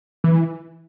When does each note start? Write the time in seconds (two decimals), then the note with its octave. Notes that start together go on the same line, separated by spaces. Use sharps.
0.24 E3